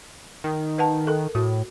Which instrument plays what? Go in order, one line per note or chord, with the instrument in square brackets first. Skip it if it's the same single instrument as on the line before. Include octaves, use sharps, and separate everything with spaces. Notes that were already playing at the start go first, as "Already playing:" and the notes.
[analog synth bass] D#3
[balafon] B4 F#5 A5
A4 A#4
[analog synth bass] A2 [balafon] F#4